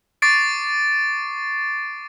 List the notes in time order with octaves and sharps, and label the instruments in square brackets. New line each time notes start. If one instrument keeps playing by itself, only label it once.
[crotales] C#6 D6 A6 C7 D7